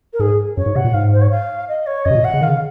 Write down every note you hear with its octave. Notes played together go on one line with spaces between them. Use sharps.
A#4
G#2 G#4
F#2 C#5
G#2
C3 F#5
A#2
G#2 F5
C5
C#5
F5
D#5
C#5
F#2 D#5
C3
A#2
F#5
C#3
D#3 F5
C#3